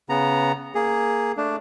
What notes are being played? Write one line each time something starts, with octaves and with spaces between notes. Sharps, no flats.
C#3 B3 A#5
A#3 G#4
A3 D4